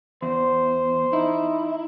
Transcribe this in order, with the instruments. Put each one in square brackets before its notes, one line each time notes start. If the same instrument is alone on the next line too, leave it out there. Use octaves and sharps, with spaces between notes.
[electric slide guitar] E2 [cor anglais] C5
[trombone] D#4 [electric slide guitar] E4